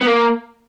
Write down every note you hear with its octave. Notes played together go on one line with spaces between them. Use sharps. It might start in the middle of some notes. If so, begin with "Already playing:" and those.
B3
A#3